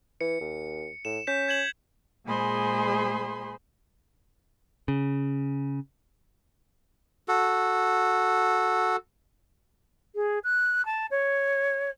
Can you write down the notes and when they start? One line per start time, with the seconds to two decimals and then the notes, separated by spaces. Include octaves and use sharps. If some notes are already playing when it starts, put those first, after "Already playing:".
0.21 E3 C#7
0.40 D#2
1.05 A2 E7
1.27 C#4 G6 B6 E7
1.48 G#6 E7 F#7
2.26 A#2 G#3 G#4 C5 B5 C6
4.88 C#3
7.28 F#4 A4
10.15 G#4
10.43 F#6
10.85 A5
11.10 C#5